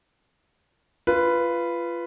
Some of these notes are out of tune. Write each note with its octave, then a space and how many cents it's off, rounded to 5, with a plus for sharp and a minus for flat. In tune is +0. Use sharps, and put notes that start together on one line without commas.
F4 -20 B4 +0